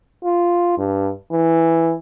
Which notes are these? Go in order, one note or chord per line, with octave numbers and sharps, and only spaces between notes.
F4
G2
E3